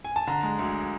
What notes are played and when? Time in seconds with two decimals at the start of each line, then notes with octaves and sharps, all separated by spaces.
0.05 G#5
0.16 A5
0.27 D3 A#5
0.43 G#3
0.59 D2